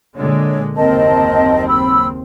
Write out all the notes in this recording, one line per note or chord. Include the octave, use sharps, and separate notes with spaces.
A#2 D3 G#3 C#5
F#1 D#2 C4 A#4 D#5 A5
B5 E6